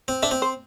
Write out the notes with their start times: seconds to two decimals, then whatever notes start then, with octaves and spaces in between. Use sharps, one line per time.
0.08 C4
0.23 D4 E5
0.31 C4
0.42 C5